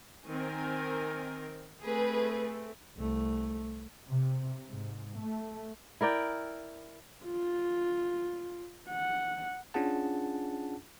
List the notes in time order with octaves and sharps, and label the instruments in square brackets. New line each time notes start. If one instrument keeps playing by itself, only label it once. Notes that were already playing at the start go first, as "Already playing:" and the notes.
[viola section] D#3 C4 A#4 [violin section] G#5
[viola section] A3 C4 A4 [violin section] G#4 B4
[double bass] C2 A3
[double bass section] C3
G#2
A3
[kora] E4 A#4 D5 G5
[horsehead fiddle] F4
F#5
[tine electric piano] C#4 D4 F4 G#4 F#5 A5